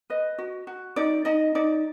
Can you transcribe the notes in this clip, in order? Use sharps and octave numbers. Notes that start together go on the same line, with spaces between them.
B4 D#5
F#4
F#4
D#4 D5
D#4 D#5
D#4 D5